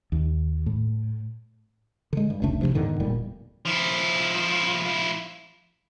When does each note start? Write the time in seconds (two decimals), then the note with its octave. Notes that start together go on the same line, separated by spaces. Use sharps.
0.12 D#2
0.66 A2
2.13 D3 G#3
2.30 G2
2.42 F1 C#2 A3 D4
2.62 G#1 G2 C3 F3
2.75 E2 G#2 D3 D#3
3.00 E1 A#2 G3
3.65 F3 E4